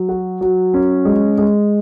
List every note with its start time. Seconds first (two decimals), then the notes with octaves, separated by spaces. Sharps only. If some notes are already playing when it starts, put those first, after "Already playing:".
Already playing: F#3
0.09 F#4
0.41 F#3
0.74 C#4
1.05 G#3
1.38 G#3